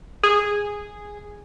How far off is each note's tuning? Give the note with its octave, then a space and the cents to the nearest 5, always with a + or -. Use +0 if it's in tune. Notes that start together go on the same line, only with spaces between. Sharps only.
G#4 -10